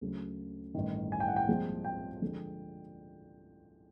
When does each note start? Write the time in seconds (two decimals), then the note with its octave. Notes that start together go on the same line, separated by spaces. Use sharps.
0.01 D2 C#3 F#3
0.75 A1 G2 D#3
1.12 G#5
1.20 G5
1.28 F#5
1.36 G5
1.49 C2 A#2 F3 G#3
1.84 G5
2.22 D3 F3 G#3